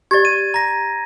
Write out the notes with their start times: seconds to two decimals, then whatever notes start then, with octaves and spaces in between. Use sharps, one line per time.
0.11 G4 D5 G#6 A6
0.25 D#7
0.54 A#5 A#6